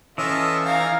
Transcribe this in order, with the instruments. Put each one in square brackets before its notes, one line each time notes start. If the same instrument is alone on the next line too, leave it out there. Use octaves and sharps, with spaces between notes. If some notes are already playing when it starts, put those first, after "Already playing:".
[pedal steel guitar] E3 [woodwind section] C#4 A4 [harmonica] F4 D#5 E5
[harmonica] D#4 G#5 A#5 [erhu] F5